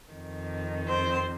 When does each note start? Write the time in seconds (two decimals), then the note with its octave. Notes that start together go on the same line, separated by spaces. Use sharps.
0.11 F2 D#3
0.88 C4 C5